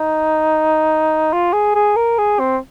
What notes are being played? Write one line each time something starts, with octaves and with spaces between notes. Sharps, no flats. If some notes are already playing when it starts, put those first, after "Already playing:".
Already playing: D#4
F4
G#4
G#4
A#4
G#4
C4